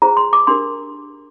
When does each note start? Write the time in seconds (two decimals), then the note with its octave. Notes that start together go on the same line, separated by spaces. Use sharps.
0.02 F4 G#4 C5 A#5
0.17 C6
0.33 D6
0.47 D4 G4 A#4 C6